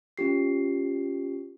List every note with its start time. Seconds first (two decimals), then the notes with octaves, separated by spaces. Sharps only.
0.18 C#4 F4 G4 C7